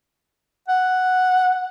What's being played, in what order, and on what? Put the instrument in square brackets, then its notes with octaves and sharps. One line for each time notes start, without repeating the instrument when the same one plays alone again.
[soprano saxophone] F#5